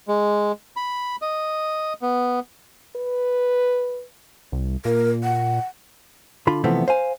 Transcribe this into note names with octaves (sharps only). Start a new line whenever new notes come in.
G#3
B5
D#5
B3
B4
C2
A#2 A#4
F#5
D3 F4 B5
C3 E3 F3 A3 B3 C4
C5 F5 G#5